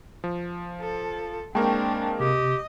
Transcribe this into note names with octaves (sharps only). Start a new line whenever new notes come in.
F3
A4
G#3 A#3 C4 D4 A#4 G5 A5 C#6
C3 G4 D#5